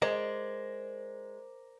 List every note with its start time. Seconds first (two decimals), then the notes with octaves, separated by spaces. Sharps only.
0.02 G#3 A#4 C5 D5